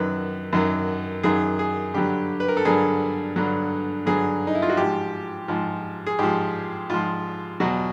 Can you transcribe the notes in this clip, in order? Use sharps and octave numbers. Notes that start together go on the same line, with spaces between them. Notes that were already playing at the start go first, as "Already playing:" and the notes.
Already playing: F#2 D#3 F#3 B4
F#2 D#3 F#3
F#2 D#3 F#3 G#4
G#4
G2 D3 F#3 G4
B4
A#4
A4
G2 D3 F#3 G#4
G2 D3 F#3
G2 D3 F#3 G#4
D#4
E4
F4
F#4
G#2 F3 G4
G#2 F3
G#4
G#2 F3 G4
G#2 F3 F4
E2 B2 F#3 F#4